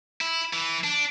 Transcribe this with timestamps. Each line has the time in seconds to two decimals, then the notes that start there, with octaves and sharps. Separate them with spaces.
0.21 E4
0.53 E3
0.84 D4